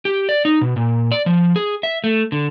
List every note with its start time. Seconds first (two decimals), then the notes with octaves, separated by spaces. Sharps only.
0.05 G4
0.29 D5
0.45 D#4
0.61 B2
0.76 A#2
1.12 D5
1.26 F3
1.56 G#4
1.83 E5
2.04 A3
2.32 D3